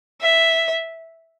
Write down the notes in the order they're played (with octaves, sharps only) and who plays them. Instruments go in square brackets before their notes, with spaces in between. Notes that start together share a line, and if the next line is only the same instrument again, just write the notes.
[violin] E5